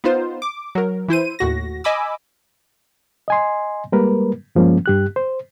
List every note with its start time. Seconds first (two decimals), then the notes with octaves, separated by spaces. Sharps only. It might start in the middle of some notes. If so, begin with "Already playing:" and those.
0.04 B3 D#4 F4 C5
0.42 D6
0.75 F#3 A#4
1.08 E3 E4 C5 D#7
1.39 D#2 A2 F#4 A#6
1.84 D#5 G#5 B5 D6 E6
3.28 D#5 G#5 C6
3.92 G3 G#3 A#3 A#4 B4
4.55 G2 F3 G#3 A#3 C#4
4.86 G2 G4 F#6
5.16 C5